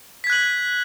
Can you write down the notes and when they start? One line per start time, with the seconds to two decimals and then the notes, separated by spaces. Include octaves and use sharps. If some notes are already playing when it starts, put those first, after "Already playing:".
0.24 B6
0.27 G#6
0.30 F#6
0.33 F#7